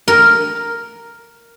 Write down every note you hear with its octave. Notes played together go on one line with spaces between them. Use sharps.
A#4